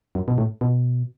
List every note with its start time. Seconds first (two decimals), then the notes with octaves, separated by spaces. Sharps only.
0.15 F#2
0.28 B2
0.38 A2
0.61 B2